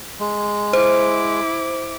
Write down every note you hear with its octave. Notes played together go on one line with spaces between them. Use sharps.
G#3
E4 C5 D6